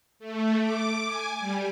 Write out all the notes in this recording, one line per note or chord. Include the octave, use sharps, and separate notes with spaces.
A3
D6
G#5
G3